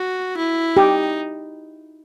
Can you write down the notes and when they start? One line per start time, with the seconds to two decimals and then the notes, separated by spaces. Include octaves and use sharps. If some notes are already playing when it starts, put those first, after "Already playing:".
Already playing: F#4
0.37 E4
0.77 D#4 G4